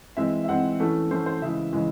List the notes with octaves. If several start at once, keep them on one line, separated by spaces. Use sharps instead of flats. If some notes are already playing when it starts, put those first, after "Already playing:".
E3 G#3 C4 E5
E5
E3 G#3 C4 F#5
E3 A3 C#4
E3 A3 C#4 C5
C5
C#3 E3 G#3 E5
C#3 E3 G#3